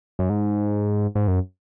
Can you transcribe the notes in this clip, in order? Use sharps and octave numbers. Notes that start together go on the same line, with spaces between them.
F#2
G#2
G#2
F#2